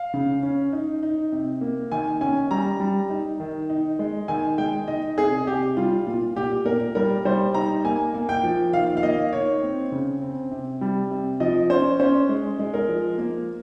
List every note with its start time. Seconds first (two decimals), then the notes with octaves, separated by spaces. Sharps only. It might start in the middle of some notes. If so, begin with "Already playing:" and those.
Already playing: F5
0.14 C#3
0.43 C#4
0.72 D#4
1.03 D#4
1.32 C3
1.61 A#3
1.92 D#3 G#5
2.21 C#4 G#5
2.51 G3 A#5
2.80 G3
3.10 D#4
3.40 D#3
3.70 D#4
3.99 G#3
4.28 D#3 G#5
4.58 G#3 G5
4.88 D#4 D#5
5.17 C3 G#4
5.47 C3 G4
5.77 G3 F4
6.06 A#2 F4
6.36 A#2 G4
6.66 A#2 A#4
6.95 G3 A#4
7.25 G3 C5
7.54 D#4 A#5
7.84 A#3 G#5
8.14 A#3
8.29 G5
8.43 F3
8.73 D#3 F5
8.97 F5
9.03 A#3 D#5
9.33 D#4 C#5
9.62 C4
9.92 C#3
10.22 C4
10.51 C3
10.81 G3
11.11 C3
11.40 F3 D#5
11.70 C#4 C5
12.00 C#4 C5
12.29 G#3
12.59 G#3
12.74 A#4
12.88 F3
13.18 A#3